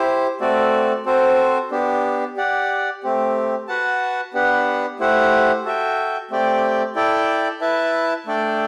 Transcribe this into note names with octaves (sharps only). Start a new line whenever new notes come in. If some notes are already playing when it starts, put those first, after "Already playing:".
Already playing: E4 G4 C5
A3 C4 F#4 A4 D5
C4 F#4 A4 C5
B3 D4 G4
G4 D5 F#5
A3 C4 G4
F#4 B4 F#5 A5
B3 D4 G4 B4 F#5
A3 E4 G4 C5 F#5
F#4 A4 E5 G5
A3 C4 G4 D5 G5
E4 A4 D5 G5
E4 B4 E5 A5
A3 D4 A4 D5 G5